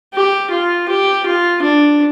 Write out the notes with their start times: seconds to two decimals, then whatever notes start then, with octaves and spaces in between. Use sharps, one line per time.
0.14 G4
0.51 F4
0.88 G4
1.26 F4
1.63 D4